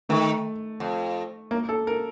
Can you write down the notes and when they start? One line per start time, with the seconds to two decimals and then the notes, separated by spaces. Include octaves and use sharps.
0.09 D#3 A3
0.80 F2
1.51 A#3
1.69 A4
1.87 A#4